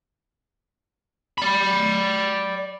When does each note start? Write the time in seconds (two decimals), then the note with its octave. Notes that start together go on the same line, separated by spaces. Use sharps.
1.38 D5 B5